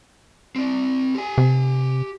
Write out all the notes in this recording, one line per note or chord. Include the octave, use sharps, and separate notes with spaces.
C4 D5
G4 G#5
C3